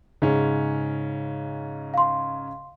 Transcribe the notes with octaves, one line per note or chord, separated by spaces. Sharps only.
G#2 C#3 C#4
F5 C6